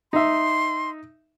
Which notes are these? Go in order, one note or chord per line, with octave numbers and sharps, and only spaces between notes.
D#4 E5 C6